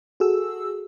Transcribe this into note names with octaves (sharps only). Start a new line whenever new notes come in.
F#4 G#4 A4 E6